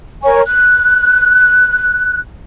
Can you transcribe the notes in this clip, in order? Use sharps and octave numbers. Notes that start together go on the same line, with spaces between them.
A#4 C#5 G#5 C#6
F#6